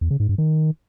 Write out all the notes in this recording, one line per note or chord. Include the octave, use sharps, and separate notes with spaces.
E2
C#3
G#2
G2
D#3